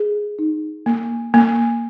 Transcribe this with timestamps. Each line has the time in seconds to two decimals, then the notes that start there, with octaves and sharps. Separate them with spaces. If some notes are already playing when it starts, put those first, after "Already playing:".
Already playing: G#4
0.39 D#4
0.86 A#3
1.34 A#3